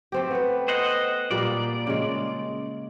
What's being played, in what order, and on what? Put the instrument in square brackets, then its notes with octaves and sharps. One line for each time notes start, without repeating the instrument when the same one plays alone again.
[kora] A3 C4 G4
B3 B4
[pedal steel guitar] C5 D#5 F#5
[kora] A#2 G3 A#3 [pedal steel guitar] D5
[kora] C#3 G#3